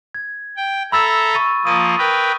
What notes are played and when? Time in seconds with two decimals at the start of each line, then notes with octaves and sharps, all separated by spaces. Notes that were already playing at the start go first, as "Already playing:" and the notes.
0.15 G#6
0.57 G5
0.92 A4 E5 A#5 B5 E6 A6
1.34 C#6 A6 D#7
1.65 F3 A#3 D#6 D#7
1.98 A#4 B4 G5